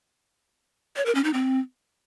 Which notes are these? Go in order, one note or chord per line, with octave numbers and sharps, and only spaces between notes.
C#5
A#4
C#4
D#4
C4